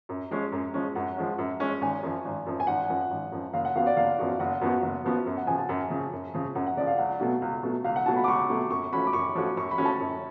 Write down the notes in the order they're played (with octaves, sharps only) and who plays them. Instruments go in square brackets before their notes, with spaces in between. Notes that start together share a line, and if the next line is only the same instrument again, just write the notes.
[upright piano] F#2
F3 G#3 C#4
F#2
F3 G#3 C#4
[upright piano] F#2 [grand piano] F#5
[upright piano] F3 G#3 C#4
F#2
F3 G#3 C#4
[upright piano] G#1 [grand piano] G#5
[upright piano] F#2 F3
G#1
F#2 F3
[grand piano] G#5
[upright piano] G#1 [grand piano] F#5
[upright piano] F#2 F3
G#1
F#2 F3
[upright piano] F#1 [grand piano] F5
[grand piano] F#5
[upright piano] F#2 F3 B3 F#4 [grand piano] F5
[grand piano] D5
[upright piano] F#1 [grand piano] F5
[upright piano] F#2 F3 B3 F#4
[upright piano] F#1 [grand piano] F#5
[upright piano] F#2 F3 B3 F#4
F#1
F#2 F3 B3 F#4
F#2
[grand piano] F#5
[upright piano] C#3 F3 [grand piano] G#5
[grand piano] A5
[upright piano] F#2
C#3 F3
F#2
C#3 F3
[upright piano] F#2 [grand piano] F#5
[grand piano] F#5
[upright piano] C#3 [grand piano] D5
[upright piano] F3
[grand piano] F5
[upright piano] C#2 [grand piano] F#5
[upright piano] B2 F#3 A3
C#2
B2 F#3 A3
[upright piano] C#2 [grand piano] F5
[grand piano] F#5
[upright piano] B2 F#3 A3 [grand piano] A5
[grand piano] B5
D6
[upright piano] C#2 [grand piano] C#6
[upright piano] B2 F#3 A3
[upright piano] F#2 [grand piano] C#6
[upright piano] F3 A3 C#4 F#4 [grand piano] B5
[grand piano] D6
[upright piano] F#2 [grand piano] C#6
[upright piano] F3 A3 C#4 F#4
[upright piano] F#2 [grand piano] C#6
[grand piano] B5
[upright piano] F3 A3 C#4 F#4
[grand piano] A5
[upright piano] F#2